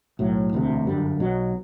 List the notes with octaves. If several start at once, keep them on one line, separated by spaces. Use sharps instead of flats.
B1 A2 F#3
E1 D2 C3
G1 F#2 D3 G3
B1 B2 F#3